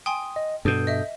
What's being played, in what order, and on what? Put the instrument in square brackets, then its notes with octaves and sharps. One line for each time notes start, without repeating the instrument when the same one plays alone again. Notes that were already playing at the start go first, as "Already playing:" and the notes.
[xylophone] G5 G#5 C6 [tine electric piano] D#6
[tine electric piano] D#5
[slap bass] G2 B2 [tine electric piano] A4 D#6 G6
[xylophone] D#5 E5